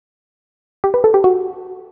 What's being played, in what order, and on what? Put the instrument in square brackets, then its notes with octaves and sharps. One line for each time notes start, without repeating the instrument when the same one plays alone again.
[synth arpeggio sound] G4
B4
A4
G4
F#4